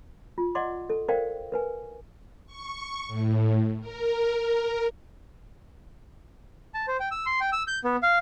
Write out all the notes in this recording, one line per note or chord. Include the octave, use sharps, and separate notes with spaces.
F4
D5 D#5 F#5 C6 D6
A4
A#4 C5 D5 F5 G5
A#4 B4 G#5
C#6
A2
A#4
A5
C5
G5
E6
C6
G5
E6
G6
B3
F5